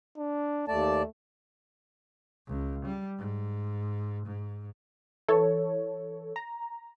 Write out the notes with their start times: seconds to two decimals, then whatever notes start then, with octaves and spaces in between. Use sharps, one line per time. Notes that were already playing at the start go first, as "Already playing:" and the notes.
0.17 D4
0.68 D#2 A3 D5 A5
2.47 C#2
2.85 G3
3.18 G#2
4.26 G#2
5.28 E3 A4 C#5
6.36 A#5